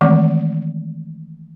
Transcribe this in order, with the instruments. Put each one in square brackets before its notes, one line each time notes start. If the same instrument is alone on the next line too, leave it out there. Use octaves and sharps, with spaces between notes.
[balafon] D#3 E3 G#3 A3 C4